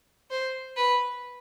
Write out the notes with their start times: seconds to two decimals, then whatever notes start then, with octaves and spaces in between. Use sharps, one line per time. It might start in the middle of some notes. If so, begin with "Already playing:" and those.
0.31 C5
0.76 B4